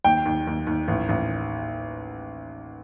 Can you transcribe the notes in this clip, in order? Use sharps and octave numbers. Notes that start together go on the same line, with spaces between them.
D#2 G5
D#2
D#2
D#2
A1
A1